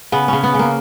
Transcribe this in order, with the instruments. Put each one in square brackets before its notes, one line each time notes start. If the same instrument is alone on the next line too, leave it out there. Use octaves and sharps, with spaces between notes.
[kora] C#3 B3
C#3 C#4
B3
C#3 A#3